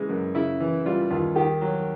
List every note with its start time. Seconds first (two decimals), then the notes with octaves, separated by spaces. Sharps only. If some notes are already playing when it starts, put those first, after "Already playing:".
Already playing: C#3 E3 G#3
0.09 F#2
0.35 C#3 E4
0.60 E3
0.85 G3 F4
1.10 D#2 F4
1.36 D#3 G4
1.61 F#3